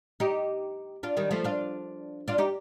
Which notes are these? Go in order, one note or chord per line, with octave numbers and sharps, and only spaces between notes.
D#4 G4
D4 F4
D#3 G3
F3 A3
D4 F4
D4 F4
D#4 G4